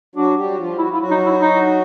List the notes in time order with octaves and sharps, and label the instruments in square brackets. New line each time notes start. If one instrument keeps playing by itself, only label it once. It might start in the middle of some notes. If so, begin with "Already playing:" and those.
[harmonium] F#3 F#4 [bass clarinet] D4
[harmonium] G3 G4
F#4
F3 F4
[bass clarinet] E4 [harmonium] F#4
[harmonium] F4
[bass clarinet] E4
[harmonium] F#3 F#4
[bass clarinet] D#4
E4
D#4